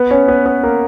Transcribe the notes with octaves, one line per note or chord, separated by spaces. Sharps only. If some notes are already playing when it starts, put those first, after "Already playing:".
Already playing: B3 B4
C#4 C#5
B3 B4
B3 B4
A#3 A#4